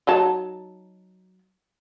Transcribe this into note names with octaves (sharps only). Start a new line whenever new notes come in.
F#3 D#4 A5